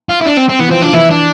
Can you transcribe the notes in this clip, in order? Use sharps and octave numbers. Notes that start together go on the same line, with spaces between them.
F4
E4
D4
C4
C4
E3 B3
F3 C4
F3 D4
E3 E4
D4